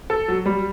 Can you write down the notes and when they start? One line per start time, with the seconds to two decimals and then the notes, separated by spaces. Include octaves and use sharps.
0.10 A4
0.28 F#3
0.46 G3